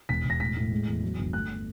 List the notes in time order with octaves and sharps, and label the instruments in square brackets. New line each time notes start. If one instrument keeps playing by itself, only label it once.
[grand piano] E1 B6
E1
A#6
A2 B6
A2
G#3
E2
F#3
G1
A3 F#6